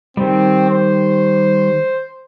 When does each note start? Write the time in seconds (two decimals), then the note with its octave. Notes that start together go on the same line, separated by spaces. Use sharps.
0.17 D#3 G3 C4
0.70 C5